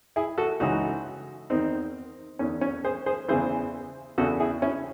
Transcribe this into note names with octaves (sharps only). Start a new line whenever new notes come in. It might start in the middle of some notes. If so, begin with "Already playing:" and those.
E4 G#4
F#4 A4
C#2 C#3 E3 D#4 F#4
E2 D#3 C4 D#4
E2 D#3 C#4
C#4
G#4 C5
G#4 C5
E2 C#3 E3 G#4 C5
E2 C#3 E3 F#4 A4
E4 G#4
C#4 E4